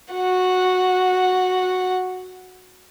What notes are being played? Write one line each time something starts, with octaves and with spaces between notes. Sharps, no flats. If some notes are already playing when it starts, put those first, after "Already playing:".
F#4 F#5